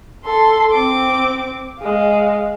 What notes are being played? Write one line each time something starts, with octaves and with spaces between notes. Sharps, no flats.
A4 C6
C4 D6
G#3 F5